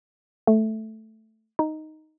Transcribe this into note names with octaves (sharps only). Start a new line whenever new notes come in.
A3
D#4